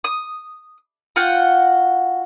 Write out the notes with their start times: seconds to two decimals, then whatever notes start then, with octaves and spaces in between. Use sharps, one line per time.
0.04 D#6
1.16 F4 F#4 F#5 G5